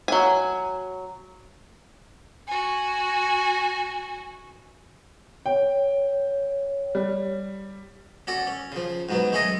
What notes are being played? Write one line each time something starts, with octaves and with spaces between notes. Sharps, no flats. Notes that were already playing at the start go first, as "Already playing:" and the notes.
F#3 G#5
F#4 G#5
C#5 G5
G3
C#4 F#4 A4 D5
C#4
C#3 F3
G#2 F#3 B3
G#3 A3 C#4 G#4 A4 D#5